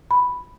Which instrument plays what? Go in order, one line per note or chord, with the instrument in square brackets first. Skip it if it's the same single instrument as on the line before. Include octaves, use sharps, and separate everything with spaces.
[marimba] B5